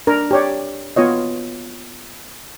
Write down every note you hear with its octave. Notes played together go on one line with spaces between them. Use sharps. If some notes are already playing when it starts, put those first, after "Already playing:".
D4 A#4
G4 C#5 D5
B3 F4 C#5 D#5